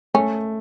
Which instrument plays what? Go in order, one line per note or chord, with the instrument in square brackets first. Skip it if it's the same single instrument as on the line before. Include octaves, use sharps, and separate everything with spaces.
[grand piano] A3 [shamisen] C#4